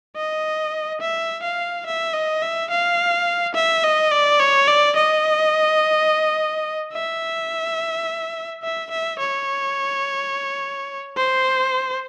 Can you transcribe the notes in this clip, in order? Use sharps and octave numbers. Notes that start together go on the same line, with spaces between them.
D#5
E5
F5
E5
D#5
E5
F5
E5
D#5
D5
C#5
D5
D#5
E5
E5
E5
C#5
C5